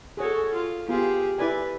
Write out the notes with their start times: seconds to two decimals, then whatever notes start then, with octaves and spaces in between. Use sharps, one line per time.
0.17 F#4 G#4 A4 C#5
0.54 F4
0.89 B3 F4 G4 G#4
1.38 E4 B4 D5 G#5